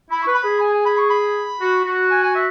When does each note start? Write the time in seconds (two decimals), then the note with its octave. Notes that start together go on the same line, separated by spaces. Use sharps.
0.11 E4 B5
0.23 B4 C#6
0.35 B5
0.44 G#4
0.60 G#5
0.74 G#5
0.85 B5
0.98 C#6
1.10 B5
1.60 F#4
1.85 F#4
2.10 G#5
2.23 G#5
2.35 E5